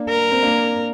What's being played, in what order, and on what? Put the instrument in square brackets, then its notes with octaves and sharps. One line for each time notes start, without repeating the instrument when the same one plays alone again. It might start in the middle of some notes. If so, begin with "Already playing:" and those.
Already playing: [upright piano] A#3 D4
[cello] A#4
[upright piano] C4
A#3 D4